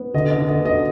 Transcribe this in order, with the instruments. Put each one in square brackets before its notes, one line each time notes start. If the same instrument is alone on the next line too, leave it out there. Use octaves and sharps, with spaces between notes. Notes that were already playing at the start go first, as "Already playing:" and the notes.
Already playing: [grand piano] B3
D3 D#5
D#5
D3
D#5
B3
D#5